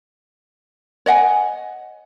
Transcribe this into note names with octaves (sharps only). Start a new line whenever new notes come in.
C#5 D#5 F#5 G#5